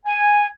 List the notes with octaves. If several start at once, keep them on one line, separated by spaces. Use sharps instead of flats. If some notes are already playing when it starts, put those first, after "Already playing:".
G#5